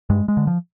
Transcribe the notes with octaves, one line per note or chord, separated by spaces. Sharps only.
G2 G#3
G#3
D3
F3